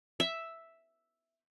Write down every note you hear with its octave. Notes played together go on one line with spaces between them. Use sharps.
E5